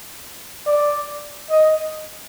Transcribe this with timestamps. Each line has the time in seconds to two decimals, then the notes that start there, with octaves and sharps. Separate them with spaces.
0.66 D5
1.50 D#5